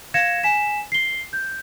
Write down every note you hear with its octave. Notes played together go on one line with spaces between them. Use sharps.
F5 G#6 A#6 C#7 E7
G#5 B6 E7
C7 G7
G6